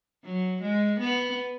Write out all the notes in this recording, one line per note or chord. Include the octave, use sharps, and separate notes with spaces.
F#3
G#3
B3